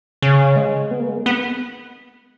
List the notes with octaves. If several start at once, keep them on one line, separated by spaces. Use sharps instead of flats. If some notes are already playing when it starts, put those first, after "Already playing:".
C#3
G#3
B3
A#3
G#3
B3